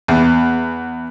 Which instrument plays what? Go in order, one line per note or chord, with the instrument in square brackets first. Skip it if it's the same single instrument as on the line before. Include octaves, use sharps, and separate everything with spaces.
[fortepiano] E2